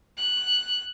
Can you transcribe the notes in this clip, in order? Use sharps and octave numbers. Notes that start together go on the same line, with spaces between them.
F#6